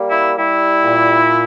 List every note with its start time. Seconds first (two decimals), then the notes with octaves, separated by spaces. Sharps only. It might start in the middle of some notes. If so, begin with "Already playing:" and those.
Already playing: G3 A#3
0.10 E4
0.38 G3 E4
0.82 A#2